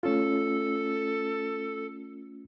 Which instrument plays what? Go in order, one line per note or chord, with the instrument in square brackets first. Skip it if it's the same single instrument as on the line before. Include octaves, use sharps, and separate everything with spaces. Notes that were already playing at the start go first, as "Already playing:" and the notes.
[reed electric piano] A3 C#4 F4 [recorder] A4